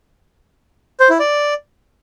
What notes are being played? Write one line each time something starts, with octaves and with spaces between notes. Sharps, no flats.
C5
E4
D5